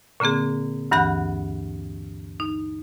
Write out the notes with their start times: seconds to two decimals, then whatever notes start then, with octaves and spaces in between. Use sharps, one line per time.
0.20 A#2 D3 A#3 C4 G#4
0.91 D2 G2 E3 F#5 B5 F#6
2.40 D#4